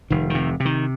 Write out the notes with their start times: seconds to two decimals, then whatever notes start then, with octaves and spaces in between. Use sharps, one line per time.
0.10 F1 D#3
0.30 C3 D#3
0.60 C3
0.65 D#3